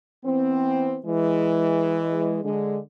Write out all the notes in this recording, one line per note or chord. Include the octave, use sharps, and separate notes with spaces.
E3 B3 C4
E3 G#3
D3 G#3